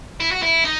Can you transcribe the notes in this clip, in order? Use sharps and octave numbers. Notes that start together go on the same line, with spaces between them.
E4
F#4
E4
D#4